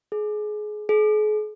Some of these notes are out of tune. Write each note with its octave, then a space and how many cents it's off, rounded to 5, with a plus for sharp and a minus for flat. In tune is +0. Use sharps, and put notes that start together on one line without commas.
G#4 +25
G#4 +40